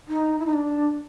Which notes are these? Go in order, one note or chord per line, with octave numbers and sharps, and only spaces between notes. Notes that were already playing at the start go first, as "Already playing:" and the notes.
D#4
E4
D#4
D4